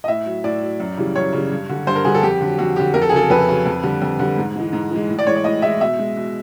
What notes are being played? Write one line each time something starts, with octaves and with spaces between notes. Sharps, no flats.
D#5
A2 E5
F#3
A2 D5
F#3
F#2
C#3 E3 G3
F#2 C#5
C#3 E3 G3
G2
D3 G3
G2 C5
A#4
D3 G3 G#4
A4
F2 G4
D3 F#3
F2 F#4
D3 F#3 G4
F2 A#4
A4
G#4
C#3 F#3 A4
F2 B4
C#3 F#3
F2
D3 G3
F2
D3 G3
G#2
E3 G#3
G#2
E3 G#3
A2
D5
E3 G#3 C#5
D5
A2 D#5
E3 G#3 E5
B2 E5
G#3
B2